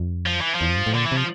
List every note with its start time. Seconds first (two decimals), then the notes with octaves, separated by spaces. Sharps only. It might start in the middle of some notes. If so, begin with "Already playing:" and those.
Already playing: F2
0.27 F3
0.41 E3
0.55 F3
0.61 E2
0.70 F2
0.77 G2
0.86 A2
0.94 A#2 D3
1.06 E3
1.12 C3
1.17 F3